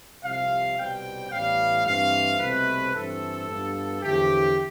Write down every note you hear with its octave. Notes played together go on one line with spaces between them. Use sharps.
C2 C3 F3 F5
C2 B2 G3 C4 G5
A1 A2 G3 B3 F5
G2 E3 A3 C4 F5
C2 B2 A3 C4 B4
G2 E3 A3 C4 A4
G2 F3 B3
E2 D3 F3 A3 G4